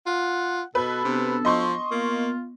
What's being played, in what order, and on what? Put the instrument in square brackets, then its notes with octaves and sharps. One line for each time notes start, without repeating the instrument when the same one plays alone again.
[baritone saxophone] F4 [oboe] F#5
[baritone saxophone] B2 [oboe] A4 [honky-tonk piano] B4 [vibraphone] D#5
[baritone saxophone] C3 [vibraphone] B3 D4 F#4
[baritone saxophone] F3 [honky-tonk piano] D#5 C6 C#6
[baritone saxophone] A#3 [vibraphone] B3 [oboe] F4